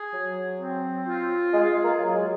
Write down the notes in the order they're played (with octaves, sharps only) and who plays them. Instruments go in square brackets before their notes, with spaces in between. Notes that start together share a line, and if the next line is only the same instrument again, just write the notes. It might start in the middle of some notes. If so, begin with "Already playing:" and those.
Already playing: [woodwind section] G#4
F#3
C4
F4
[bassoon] G#3 [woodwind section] G#4
[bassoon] A#3
[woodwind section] F#3
[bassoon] G#3